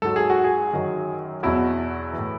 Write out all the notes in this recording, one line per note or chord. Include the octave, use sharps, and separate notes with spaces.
G#2 F#3 A4
G#4
F#4
G#4
F#2 D#3 F#3
E2 B2 F#3 E4
E3
A2